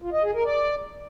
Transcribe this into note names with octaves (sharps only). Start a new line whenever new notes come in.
F4
D#5
G#4
A#4
D5